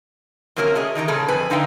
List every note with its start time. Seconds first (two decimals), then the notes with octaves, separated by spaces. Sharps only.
0.56 C3 F#3 A#3 C#4 F#4 A#4
0.75 A3 G#4 D#5
0.95 D#3 D#4 G4 A#5
1.08 A#2 C#3 G3 G#4 A4
1.28 F2 B4 G#5
1.50 D3 D#4 D#5 F5 G5